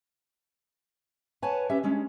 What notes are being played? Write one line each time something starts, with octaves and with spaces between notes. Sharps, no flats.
B4 C#5 F#5 G#5 A5
C#4 G4 B4 E5
G3 G#3 C#4 D4